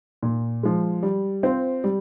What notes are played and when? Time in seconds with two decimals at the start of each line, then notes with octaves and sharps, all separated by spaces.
0.23 A#2
0.63 F3 G#3
1.03 G3
1.43 C4 F4 C5
1.84 G3